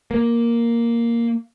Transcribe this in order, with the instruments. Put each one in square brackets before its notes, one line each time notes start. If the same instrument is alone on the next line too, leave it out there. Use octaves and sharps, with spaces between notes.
[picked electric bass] A#3